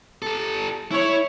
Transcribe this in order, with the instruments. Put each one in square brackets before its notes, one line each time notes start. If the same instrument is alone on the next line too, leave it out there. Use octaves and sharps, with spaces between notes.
[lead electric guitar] G4 A4
[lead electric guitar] E4 [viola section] C#5